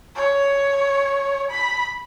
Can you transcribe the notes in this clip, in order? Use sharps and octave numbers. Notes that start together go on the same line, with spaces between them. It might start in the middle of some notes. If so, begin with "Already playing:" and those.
C#5
B5